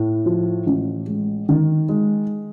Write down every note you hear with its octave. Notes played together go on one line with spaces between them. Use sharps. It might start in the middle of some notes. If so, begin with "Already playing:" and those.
Already playing: A2
F3
A1
G#3
D#3
G#3